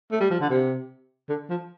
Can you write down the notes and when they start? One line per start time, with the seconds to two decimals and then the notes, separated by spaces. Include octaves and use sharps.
0.12 A3
0.20 G3
0.30 F3
0.41 D3
0.50 C3
1.29 D3
1.50 F3